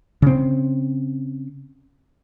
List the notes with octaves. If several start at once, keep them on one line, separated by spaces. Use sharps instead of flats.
C#3 C4